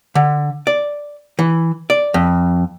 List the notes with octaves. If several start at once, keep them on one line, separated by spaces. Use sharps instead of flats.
D3
D5
E3
D5
F2